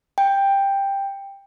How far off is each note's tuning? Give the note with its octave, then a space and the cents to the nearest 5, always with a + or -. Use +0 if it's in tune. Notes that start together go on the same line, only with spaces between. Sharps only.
G5 +10